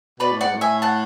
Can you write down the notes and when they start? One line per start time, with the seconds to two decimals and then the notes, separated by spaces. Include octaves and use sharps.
0.20 B2 B4 D5
0.32 A2
0.41 G#2 D5 F#5
0.55 A2
0.61 E5 G#5
0.82 F#5 A5